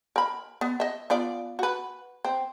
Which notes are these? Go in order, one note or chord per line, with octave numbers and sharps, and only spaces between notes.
A#4 B5
B3
D#5 E5
B3 F4 D5
F#4 B4
C4